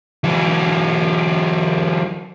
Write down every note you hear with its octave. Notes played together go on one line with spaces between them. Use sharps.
E3 F#3